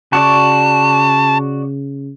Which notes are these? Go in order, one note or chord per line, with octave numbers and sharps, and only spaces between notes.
C#3 F#4 D5 A5 C#6